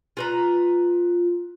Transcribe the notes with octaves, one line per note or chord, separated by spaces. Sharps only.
F4 B4 A#5